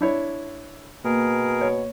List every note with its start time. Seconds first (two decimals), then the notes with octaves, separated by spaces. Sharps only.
0.01 D4 E4 C#5
1.04 B2 A#3 G#4 A#4
1.61 C#5